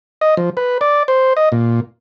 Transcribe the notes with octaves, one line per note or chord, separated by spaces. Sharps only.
D#5
F3
B4
D5
C5
D#5
A#2